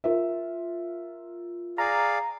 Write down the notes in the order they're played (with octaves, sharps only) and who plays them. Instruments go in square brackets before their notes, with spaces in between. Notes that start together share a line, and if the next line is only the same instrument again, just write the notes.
[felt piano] F4 A#4 E5
[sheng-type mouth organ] G#4 D5 F5 [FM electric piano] A#5